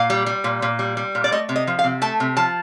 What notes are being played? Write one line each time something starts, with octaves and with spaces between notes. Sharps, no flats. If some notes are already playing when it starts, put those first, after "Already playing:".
Already playing: A#2 F5
G3
G3
A#2
A#2
G3
G3
A#2
D5
A3 D#5
C3
D#5
F3
F5
C3
A3 A5
C3
F3 A5